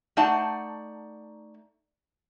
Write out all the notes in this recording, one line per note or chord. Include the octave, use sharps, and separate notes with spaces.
A3 D#4 D5 F#5 A5